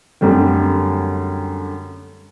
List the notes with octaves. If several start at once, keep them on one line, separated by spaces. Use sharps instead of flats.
F#2 D3 G3 A3 C4